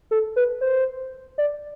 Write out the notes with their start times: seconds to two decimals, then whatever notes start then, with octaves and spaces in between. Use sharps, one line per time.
0.11 A4
0.36 B4
0.61 C5
1.38 D5